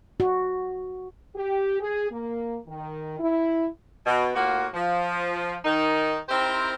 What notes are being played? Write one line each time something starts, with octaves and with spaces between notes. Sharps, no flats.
F#4
G4
G#4
A#3
D#3
E4
B2
A2 A#3 F4 F#4
F3
D#3 D#4
C4 D#4 E4 G4 A#4 C5